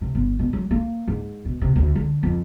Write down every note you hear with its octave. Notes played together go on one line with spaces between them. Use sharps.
C3
G1
B2
F#3
A#3
G#2
B2
C3
D2
D3
F2